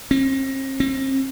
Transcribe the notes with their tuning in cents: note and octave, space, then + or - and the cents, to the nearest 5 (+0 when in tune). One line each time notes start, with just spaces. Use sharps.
C4 +45
C4 +40